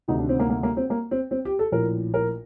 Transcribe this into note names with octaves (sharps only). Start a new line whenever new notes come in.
D2 C3 D#3 D#4
D4
C4
A#3
A#3
A#3
C4
A#3
C4
C4
G4
A4
A#1 A2 A#4
A#4